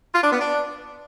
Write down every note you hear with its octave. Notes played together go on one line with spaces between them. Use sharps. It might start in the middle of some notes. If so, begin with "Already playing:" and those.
F4
D4
B3
D4